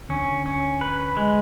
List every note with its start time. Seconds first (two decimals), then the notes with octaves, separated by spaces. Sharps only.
0.09 D2 D3 C#4
0.46 C#4
0.81 B4
1.17 G#3